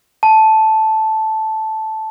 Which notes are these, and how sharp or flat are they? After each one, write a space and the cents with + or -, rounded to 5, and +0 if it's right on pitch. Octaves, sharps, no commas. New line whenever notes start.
A5 -5